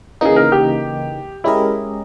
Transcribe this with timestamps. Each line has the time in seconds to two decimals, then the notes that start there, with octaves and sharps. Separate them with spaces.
0.21 C#3 E3 A#3 D#4 G#4
0.36 A#4
0.52 G4
1.44 G#3 C#4 E4 G4 A#4 D#5